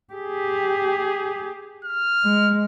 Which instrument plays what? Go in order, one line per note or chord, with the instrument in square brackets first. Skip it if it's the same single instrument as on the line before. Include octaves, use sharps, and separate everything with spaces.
[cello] G4 [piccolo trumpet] G#4
[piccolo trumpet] F6
[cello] G#3